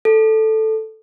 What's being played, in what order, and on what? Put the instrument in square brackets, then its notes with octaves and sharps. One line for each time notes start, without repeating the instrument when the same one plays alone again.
[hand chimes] A4